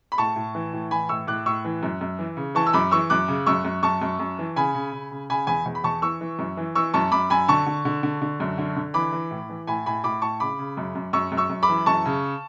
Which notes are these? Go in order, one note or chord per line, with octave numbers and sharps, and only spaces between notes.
B5
A2 A5 C#6
A2
E3
A2
E3 G#5 B5
A2 C#6 E6
A2 D6 F#6
A2 C#6 E6
E3
F#2
F#2
E3
C#3
E3 A5 C#6
E6
F#2 B5 D6
E3 C#6 E6
F#2 D6 F#6
C#3
F#2 C#6 E6
F#2
F#2 A5 C#6
F#2
F#2
E3
C#3 G#5 B5
C#3
C#3
C#3
C#3 G#5 B5
E2 G#5 B5
E2
B5
E2 A5 C#6
E3 C#6 E6
E3
F#2
E3
E3 C#6 E6
F#2 A5 C#6
F#2 B5 D6
F#2 G#5 B5
D3 A5 C#6
D3
D3
D3
D3
F#2
D3
D3
E3 B5 D6
E3
A2
E3
A2 G#5 B5
A2 G#5 B5
A2 B5 D6
A2 A5 C#6
C#3 B5 D6
C#3
F#2
F#2
F#2 C#6 E6
F#2
C#6 E6
F#2
B5 D6
E3
F#2 A5 C#6
C#3